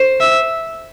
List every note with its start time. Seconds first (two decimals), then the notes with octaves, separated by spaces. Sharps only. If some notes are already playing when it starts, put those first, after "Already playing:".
Already playing: C5
0.21 E5